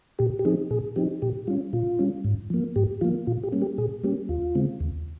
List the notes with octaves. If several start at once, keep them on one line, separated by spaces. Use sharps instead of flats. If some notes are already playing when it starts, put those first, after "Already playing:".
A#2 G4
G4
F3 C4 D#4 G#4
A#2 G#4
F3 C4 D#4 G4
A#2 G4
G3 C#4 F4
A#2 F4
G3 C#4
G#2
F3 A#3
G#2 G4
F3 A#3 F4
A#2 F4
G4
G3 A#3 C#4
G4
A#2 G#4
G3 A#3 C#4 G4
D#2 F4
C#3 G#3 C4
D#2